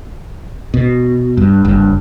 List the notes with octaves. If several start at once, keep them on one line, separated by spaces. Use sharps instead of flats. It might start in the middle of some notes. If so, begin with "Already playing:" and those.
B2
G2
F#1 G2